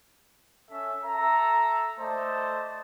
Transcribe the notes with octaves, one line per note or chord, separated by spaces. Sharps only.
C#4 A4 E5
A4 E5 A#5
A3 C5 D5 D#5 A5